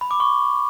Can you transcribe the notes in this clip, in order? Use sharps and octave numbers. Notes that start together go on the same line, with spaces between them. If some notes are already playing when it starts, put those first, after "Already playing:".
B5
D6
C#6